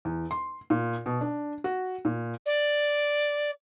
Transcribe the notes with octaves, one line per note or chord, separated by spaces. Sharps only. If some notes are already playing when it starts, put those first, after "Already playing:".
E2
C6
A#2
B2
D4
F#4
A#2
D5